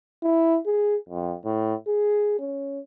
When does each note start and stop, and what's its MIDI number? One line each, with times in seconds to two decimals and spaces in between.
0.23 0.58 64
0.66 0.95 68
1.09 1.35 41
1.45 1.74 45
1.87 2.39 68
2.39 2.79 61